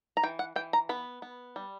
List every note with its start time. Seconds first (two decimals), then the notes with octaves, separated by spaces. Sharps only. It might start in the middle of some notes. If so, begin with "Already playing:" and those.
0.17 A#5
0.23 E3 G5
0.39 F#5
0.56 E3 G5
0.73 A#5
0.89 B3 B5
1.22 B3
1.56 G3